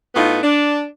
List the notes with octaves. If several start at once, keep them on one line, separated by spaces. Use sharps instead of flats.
A2 B3 D#4 F4
D4